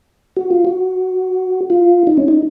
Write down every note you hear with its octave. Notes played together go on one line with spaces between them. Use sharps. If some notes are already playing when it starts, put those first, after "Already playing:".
F#4
F4
F#4
F4
D#4
C#4
D#4